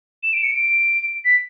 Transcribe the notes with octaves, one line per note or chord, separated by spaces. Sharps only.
E7
D7
C#7
D7
B6